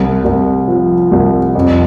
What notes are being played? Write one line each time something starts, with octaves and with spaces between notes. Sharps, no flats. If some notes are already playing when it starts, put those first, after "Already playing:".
Already playing: C2
C2
F3
C2
F2